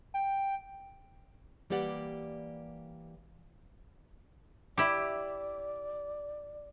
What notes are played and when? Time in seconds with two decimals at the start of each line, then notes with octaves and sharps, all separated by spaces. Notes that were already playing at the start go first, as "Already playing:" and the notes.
0.14 G5
1.70 E3 G3 A#3 G4 D5 F#5
4.78 E4 G4 D5